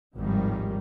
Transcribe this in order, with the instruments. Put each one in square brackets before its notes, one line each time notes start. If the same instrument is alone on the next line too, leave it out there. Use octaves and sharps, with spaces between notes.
[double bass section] G#1 D#2 A2 D#3 F3 G3